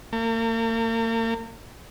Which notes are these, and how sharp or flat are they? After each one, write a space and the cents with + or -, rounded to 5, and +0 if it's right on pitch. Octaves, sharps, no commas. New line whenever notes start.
A#3 -40